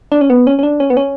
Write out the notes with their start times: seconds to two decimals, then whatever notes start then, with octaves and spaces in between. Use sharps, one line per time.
0.12 D4
0.21 C#4
0.30 B3
0.47 C#4
0.59 C#4
0.63 D4
0.80 C#4
0.90 B3
0.97 C#4